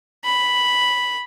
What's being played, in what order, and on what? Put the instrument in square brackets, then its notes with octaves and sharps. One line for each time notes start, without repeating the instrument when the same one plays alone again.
[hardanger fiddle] B5